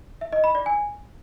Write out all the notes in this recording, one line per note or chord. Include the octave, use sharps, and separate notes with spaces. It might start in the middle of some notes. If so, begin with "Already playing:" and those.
E5
D#5
B5
D5
G#5